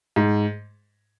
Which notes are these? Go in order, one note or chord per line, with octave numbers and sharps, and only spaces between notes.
G#2